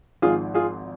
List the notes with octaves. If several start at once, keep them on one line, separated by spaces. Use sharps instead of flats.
G#1 G#2 F3 F4 G#4
F4 G#4